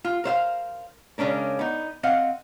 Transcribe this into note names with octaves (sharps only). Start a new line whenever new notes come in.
F4
A#4 C5 E5 F5
C#3 G#3 C#4 D4 A#4
B3 D#4
C4 D#5 F5 F#5